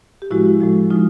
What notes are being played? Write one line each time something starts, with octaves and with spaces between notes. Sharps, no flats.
G4
A2 F3 G#3 E4 F#4
A2 F3 G#3
F3 G#3 D#4 F4